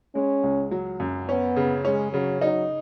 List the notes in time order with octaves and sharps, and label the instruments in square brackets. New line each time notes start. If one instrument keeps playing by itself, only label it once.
[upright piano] G#3 [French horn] C#4
[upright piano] C#2
F#3
F#2
[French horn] B3 [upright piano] C#4
[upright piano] C#3
[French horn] G#3 [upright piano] C#4
[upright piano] C#3 [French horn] F#3
[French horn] F#3 [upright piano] D#4